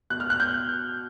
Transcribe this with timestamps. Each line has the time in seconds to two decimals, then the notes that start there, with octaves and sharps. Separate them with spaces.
0.10 B2 F#6
0.20 F6
0.30 F#6
0.40 G6